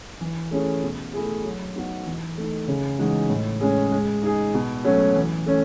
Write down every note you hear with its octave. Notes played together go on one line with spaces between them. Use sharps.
E3
A3 C#4 E4 G#4
B2
A3 E4 G#4
F#3
B3 D#4 F#4
E3
A3 D#4
C#3
E3 G#3 D#4 F#4
A2
G#3 C#4 G#4
G#3
D#4 G#4
B2
F#3 A3 C#4
E3
A3 C#4